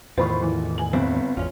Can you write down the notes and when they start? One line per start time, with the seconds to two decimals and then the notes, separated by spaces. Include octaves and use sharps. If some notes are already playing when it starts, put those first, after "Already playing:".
0.18 E2 A2 D#3 F4 C5 B5 C#6
0.42 E3
0.78 G#5 F#7
0.93 G1 B3 C4
1.37 G#1 E2 C#4 F4